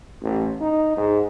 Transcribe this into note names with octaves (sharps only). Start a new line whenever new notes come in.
A1
D#4
G#2